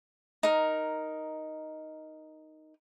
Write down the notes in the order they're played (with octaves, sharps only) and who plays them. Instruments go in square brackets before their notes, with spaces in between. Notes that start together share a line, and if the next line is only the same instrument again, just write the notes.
[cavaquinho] D#4 A#4